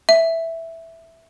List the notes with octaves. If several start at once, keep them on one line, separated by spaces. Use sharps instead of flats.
E5